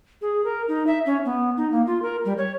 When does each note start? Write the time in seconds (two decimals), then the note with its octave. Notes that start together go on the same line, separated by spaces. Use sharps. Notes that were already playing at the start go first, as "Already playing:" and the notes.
0.22 G#4
0.44 A#4
0.68 D#4
0.87 E5
1.06 C#4
1.25 B3
1.57 D#4
1.72 A#3
1.87 F4
2.02 A#4
2.25 G3
2.38 C#5